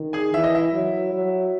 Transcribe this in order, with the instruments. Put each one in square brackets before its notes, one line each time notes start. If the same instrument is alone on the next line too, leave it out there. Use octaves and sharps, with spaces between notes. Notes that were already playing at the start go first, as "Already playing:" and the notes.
Already playing: [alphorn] D#3
[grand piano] G#4 G#5
[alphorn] E3 [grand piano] E5
[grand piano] D#5
E4 E5
[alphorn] F#3
F#3